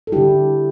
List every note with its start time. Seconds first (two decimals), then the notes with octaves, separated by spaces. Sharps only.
0.07 A4
0.12 D3 G3 E4 G4